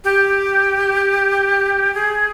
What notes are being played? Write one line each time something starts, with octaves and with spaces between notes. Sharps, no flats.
G4
G#4